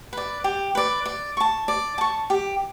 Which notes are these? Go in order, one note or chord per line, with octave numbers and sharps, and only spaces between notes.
B4 D5
G4
B4 D5
D5
A5 C#6
D5
A5 C#6
G4